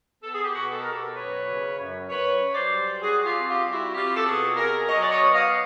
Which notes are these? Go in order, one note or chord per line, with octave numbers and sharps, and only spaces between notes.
B3 A4
G#4
G4
B2 F#4 G#4
A4
B2 A#4
G4 A4
F#2 B4 C#5
C#3
F#2
F#2 B4 C#5
F#2
C5 D5
G3
G3 F#4 G#4
F4 G4
C4
F4 G4
G3
E4 F#4
C4 F4 G4
A4
B2 F#4 G#4
B2 G#4 A#4
F#3 C#5 D#5
D5
C#5 D#5
B3
D#5 F5